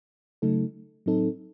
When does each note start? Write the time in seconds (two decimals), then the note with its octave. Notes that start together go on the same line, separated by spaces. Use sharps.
0.42 C#3 F#3 A3 D#4 A4
1.06 A2 F#3 C4 D#4 A4